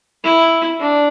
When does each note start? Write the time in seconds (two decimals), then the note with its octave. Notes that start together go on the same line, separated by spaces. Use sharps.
0.24 E4
0.80 D4